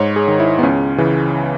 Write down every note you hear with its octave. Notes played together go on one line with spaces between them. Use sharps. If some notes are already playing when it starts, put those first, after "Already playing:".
Already playing: G#2 C#5
G#4
D#3
E4
B3
C#2 C#4
C#3 E3